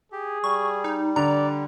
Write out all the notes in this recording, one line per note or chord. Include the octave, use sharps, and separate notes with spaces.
G4 G#4
G3 C#6
D#4
D3 D5 A#5